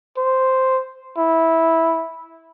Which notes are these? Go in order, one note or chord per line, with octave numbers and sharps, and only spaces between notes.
C5
E4